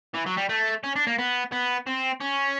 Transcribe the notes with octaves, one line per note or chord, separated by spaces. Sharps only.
E3
F#3
G3
A3
C#4
D4
A#3
B3
B3
C4
C#4